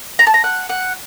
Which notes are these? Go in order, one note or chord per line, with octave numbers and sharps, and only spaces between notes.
A#5
A5
A#5
F#5
F#5